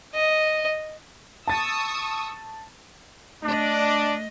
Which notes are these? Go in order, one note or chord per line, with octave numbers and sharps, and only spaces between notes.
D#5
A5 C#6 D#6 E6 A6
A3 D4 D#5